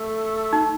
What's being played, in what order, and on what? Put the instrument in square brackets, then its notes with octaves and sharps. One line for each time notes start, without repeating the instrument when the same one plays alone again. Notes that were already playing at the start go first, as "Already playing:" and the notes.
Already playing: [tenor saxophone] A3
[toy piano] D#4